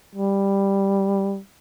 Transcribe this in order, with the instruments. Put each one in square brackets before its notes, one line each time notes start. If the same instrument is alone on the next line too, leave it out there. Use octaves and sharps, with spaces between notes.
[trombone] G3